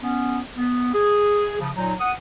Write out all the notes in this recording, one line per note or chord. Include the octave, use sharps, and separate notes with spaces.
B3 C#4
B3
G#4
C#3 F3
A#2 F#3 D#4
F#5 D#6